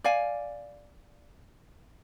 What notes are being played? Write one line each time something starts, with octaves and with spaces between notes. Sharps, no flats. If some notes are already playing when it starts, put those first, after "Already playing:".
D5 F5 G#5